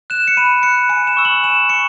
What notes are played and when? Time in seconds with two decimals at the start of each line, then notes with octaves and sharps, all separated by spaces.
0.10 F#6 E7
0.28 C#7
0.37 B5 D#7
0.63 F#6 C#7
0.89 G#5 C#7
1.07 E7
1.17 C#6 E6
1.25 F#7
1.43 G#5 E7
1.69 C#6 C#7